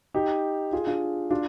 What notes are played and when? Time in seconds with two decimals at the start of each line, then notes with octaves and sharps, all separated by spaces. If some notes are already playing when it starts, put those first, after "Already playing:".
0.14 D#4 G4
0.73 F4 G#4
0.87 D4 F4
1.30 D4 F4